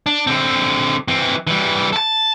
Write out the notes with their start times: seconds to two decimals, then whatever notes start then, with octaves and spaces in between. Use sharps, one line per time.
0.06 D4
0.27 D3 C4
1.08 E3 C4
1.47 E3 G3
1.93 A4 A5